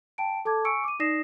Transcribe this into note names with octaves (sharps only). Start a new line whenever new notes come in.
G5 A5 D7
A4 A5 D6 G#6
G#5 C#6 E6 C#7 D7
D6 D#7
D#4 D5 D#6 A#6 C7 E7